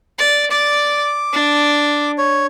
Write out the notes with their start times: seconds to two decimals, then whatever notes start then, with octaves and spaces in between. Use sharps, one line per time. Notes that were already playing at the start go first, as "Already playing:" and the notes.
0.18 D5
0.51 D5 D6
1.33 D4
2.18 C#5